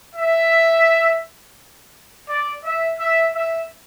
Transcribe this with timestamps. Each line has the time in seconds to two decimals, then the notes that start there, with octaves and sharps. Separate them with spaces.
0.16 E5
2.28 D5
2.65 E5
3.00 E5
3.35 E5